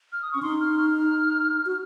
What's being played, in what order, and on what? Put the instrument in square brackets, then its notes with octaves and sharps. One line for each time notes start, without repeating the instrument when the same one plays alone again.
[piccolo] F6
D#6
[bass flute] C#4 [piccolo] C#6
[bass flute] D#4 [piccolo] C6
[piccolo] F6
F6
[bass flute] F#4